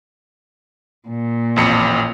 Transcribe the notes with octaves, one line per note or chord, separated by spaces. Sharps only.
A#2
A1 F2 C#7